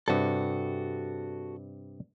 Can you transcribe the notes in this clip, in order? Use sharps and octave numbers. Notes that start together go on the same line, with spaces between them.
G2 C3 G3 F#4 A4